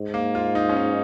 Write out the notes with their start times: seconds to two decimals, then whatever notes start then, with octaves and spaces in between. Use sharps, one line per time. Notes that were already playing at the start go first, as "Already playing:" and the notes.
Already playing: G#2
0.14 A#3
0.35 F4
0.55 D#4
0.69 C#4
0.77 D#4